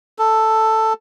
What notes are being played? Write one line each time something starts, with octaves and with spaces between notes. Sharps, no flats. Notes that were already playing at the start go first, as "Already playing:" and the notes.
A4